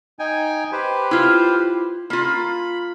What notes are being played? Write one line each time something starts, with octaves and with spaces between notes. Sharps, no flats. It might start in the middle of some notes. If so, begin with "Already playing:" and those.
D#4 G5 G#5
G4 B4 C5
E4 F4
A#3 F4 B5